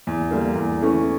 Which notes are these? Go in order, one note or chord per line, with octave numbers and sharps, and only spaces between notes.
E2
D3 G3 A#3
E2
E3 A3 C#4